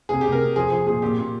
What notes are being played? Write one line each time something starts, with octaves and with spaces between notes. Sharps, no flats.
C3 G#4
C3 G4
A#4
C3
F3 G#4
F3 G#4
A#2 G#4
A#2 G4
A#2